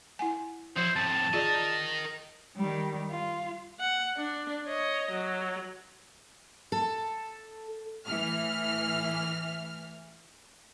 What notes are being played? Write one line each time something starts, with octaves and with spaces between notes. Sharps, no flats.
E4 F#5 G#5
F3 E4 F#4 C5
F2 A2 A5
F4 G#4 A#4 D5 D#5
D#3 G3
F4
F#5
D4
C#5 D#5
F#3
A4
A2 E3 F6